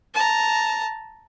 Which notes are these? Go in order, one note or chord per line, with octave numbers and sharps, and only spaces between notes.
A5 A#5